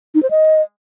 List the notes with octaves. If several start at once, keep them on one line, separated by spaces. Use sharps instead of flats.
D#4
C5
D#5